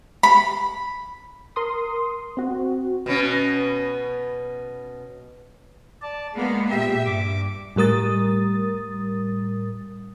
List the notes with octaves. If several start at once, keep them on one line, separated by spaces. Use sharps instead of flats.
B5
A#4 C6 D#6
C4 F#4
B2 B3 C#4
D5 A5
G#3 A#3 B3
A#2 G4 E5
G2 D6
A2 G3 A#4 D#6 A6